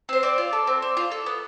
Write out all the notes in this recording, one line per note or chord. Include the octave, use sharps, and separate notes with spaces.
C4 C5
C4 D5
F4
A4
C4
C4
F4
A4
B3